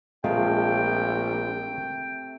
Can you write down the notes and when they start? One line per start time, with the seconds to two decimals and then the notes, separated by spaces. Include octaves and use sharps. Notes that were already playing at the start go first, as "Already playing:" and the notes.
0.24 A#1 C3 G#3 A3 F4 G5